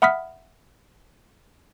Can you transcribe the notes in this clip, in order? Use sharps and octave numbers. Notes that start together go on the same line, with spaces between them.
E5 F#5 B5 D#6 F6 B6